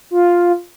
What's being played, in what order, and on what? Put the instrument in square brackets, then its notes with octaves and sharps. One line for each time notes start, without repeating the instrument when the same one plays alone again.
[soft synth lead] F4